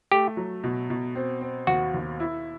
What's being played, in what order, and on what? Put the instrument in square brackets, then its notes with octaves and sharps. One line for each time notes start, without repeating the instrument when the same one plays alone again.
[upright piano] A3 [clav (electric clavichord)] G4
[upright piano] F#3
B2
B2
C4
C4
[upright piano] D#2 [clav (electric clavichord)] F#4
[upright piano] D#2
E4